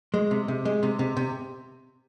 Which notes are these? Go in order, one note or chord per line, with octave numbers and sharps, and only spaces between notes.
G#3
C3
C3
G#3
C3
C3
C3